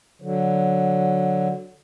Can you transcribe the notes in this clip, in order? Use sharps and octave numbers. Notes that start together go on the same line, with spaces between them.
D3 F#3